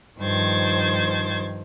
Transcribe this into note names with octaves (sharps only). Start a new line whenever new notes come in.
G2 D#3 F3 C5 G#6 A6